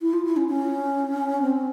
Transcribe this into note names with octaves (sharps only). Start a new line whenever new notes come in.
E4
F4
E4
C#4
C#4
C4